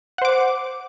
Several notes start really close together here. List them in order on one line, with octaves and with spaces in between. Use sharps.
F#5 C5 D6